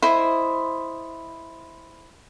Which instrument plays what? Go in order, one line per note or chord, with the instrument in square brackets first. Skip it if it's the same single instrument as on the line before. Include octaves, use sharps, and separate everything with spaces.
[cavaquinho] E4 C5 D#5